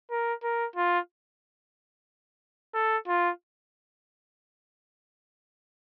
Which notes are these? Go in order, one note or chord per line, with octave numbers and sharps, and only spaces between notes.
A#4
A#4
F4
A4
F4